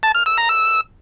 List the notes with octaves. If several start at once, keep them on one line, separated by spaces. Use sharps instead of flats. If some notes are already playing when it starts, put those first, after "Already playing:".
A5
F6
E6
A#5
E6